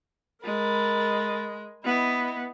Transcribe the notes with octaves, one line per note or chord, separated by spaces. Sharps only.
G#3 A#4 B5 A6
B3 E4 D#5